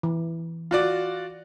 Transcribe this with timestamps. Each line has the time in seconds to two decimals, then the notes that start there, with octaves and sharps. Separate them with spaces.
0.03 E3
0.71 F4 F#4 D5